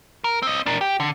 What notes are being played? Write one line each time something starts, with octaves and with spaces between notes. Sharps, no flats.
A#4
C4 D#5
D4 A#4
G4
D3